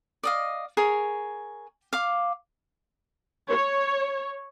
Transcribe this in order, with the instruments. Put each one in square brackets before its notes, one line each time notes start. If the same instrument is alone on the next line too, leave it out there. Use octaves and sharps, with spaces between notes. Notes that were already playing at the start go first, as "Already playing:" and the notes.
[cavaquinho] D5 D#5 F5
G#4 A#4 C#5
F5 D6
[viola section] C#5